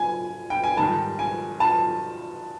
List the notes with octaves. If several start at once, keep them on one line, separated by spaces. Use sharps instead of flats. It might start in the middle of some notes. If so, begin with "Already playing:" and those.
Already playing: G#5
G5
G#5
G#2 D#3 G3 A5
G#5
A5